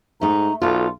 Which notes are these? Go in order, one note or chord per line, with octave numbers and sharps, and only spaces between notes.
G#2 A3 D#4 A#5
B1 F4 A4 C6